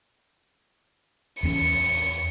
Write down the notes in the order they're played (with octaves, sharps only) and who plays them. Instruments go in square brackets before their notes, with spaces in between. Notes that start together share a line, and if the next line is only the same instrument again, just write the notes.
[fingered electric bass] E2 C4 C#4 [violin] C#7